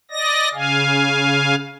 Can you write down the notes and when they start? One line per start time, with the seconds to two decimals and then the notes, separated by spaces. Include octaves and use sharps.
0.11 D5 D#5 A#6
0.54 C#3 F5 G#5